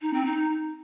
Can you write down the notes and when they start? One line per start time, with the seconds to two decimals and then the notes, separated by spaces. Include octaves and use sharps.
0.02 D#4
0.14 C4
0.25 D#4